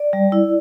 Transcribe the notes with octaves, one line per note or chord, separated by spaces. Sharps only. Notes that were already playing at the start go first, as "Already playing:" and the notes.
Already playing: D5
G3
E4